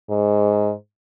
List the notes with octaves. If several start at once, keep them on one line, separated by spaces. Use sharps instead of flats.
G#2